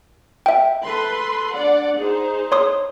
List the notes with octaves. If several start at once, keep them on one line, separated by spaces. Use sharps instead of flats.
E5 G5
A4 B4 C6
D4 D5 F#5
D#4 G#4 C5
C#5 C6 D#6